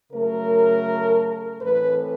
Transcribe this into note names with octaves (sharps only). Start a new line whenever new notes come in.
C#3 F#3 A3 A#4
A2 E3 A3 C4 B4